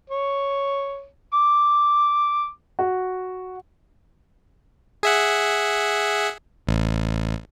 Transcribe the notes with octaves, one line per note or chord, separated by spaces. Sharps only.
C#5
D6
F#4
G#4 E5 F#5
A1